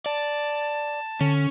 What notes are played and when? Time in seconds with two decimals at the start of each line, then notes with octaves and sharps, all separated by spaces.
0.06 D5 A5
1.21 D3 C#4